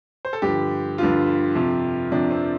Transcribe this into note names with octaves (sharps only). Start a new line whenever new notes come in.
C5
A4
G2 D3 F3 G4
G2 D3 F3 F4
F2 C3 F3
F2 C3 F3 D4
C4